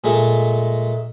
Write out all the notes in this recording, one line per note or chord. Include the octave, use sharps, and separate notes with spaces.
A#2 G#3 A3